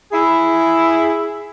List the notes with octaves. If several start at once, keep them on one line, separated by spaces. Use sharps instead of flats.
E4 G#4